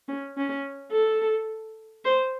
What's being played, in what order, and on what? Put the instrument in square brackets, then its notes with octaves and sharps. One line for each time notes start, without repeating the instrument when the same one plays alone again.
[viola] C#4
C#4
A4
C5